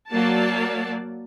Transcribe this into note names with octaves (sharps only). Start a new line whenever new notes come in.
F#3 A#3 D5 A5